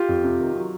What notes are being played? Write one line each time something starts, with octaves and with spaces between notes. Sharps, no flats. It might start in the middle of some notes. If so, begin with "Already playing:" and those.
Already playing: F4 G4
F2
C3
D#3
F#3